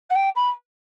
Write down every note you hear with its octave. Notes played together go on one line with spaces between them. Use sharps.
F#5
G5
B5